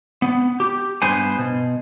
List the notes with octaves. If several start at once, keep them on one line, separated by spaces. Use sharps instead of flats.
B3
G4
G2 B3 C5 G#5
B2